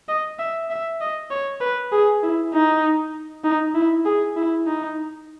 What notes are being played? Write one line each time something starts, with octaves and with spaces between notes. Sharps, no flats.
D#5
E5
E5
D#5
C#5
B4
G#4
E4
D#4
D#4
E4
G#4
E4
D#4